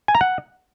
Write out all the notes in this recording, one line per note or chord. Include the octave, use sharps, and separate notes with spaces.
G#5
A#5
F#5